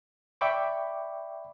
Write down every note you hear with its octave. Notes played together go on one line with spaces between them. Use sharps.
D5 E5 G5 B5 C#6 D6